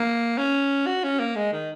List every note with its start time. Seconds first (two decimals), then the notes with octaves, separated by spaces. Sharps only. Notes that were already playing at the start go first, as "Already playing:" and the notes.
Already playing: A#3
0.38 C#4
0.87 F#4
1.04 C#4
1.20 A#3
1.36 G#3
1.53 D#3